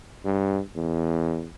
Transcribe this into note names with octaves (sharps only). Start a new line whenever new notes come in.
G2
E2